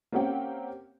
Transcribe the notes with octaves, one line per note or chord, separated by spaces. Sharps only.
A#3 C4 C#4 G4 F#5 G5